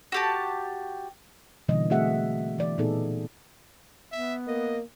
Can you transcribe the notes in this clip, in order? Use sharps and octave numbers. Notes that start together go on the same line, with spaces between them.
F#4 G4 A5
B2 D3 E3 G3 A#3 D#5
A3 C4 F#4 G#4 E5 F#5
E3 D5
A#2 B3 D#4 G#4 A4
B3 E5
A#3 D#5